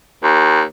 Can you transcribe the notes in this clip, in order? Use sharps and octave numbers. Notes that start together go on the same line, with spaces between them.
D#2